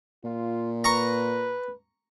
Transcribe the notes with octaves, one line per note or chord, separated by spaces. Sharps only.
A#2 F4
B4 A#5 C#6